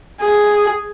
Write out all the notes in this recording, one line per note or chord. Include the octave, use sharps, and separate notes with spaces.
G#4